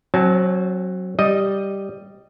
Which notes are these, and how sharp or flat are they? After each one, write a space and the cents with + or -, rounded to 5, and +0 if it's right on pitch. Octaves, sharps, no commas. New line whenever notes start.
F#3 +0 C4 +35 A5 -30
G3 +0 D#5 +0